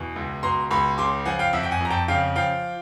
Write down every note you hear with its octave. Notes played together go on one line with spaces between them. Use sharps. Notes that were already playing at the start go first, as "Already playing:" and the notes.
Already playing: E2 B2
C#2
B2 A#5 C6
C#2 B5 C#6
C#3 C6 D6
F3 F#5 G#5
F5 G5
F2 E5 F#5
G5
F#5 G#5
F2 A#5
G5 A5
C#3 F5 G5
F3 F5 G5